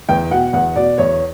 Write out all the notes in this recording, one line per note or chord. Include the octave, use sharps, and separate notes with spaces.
E2 G5
B2 F#5
E2 F#5
B2 D5
E2 C#5